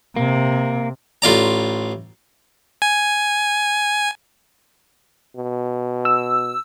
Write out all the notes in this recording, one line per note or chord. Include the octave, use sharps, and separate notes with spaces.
C3 A#3
A1 F4 D5 A#5
G#5
B2
E6